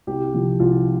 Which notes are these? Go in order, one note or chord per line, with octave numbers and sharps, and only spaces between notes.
C2 G4
C3 F3
C2 F4